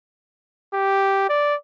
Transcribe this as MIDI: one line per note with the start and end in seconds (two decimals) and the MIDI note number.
0.74 1.27 67
1.29 1.55 74